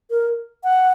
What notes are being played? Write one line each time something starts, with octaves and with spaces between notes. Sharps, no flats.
A#4
F#5